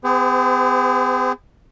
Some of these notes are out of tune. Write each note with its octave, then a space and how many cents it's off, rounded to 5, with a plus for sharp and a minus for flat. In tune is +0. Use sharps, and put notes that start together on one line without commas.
B3 +45 G#4 -40 C5 -30